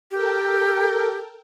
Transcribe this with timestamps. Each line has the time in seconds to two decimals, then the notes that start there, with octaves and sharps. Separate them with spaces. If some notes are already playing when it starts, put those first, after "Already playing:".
0.11 G4 A4 A#4 G5